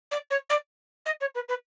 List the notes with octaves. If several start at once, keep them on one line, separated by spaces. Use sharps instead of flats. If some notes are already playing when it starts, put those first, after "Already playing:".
D5
C#5
D5
D#5
C#5
B4
B4